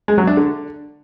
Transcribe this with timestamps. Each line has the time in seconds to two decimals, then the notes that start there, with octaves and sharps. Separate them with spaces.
0.08 G#3
0.18 F#3
0.27 D4
0.37 D3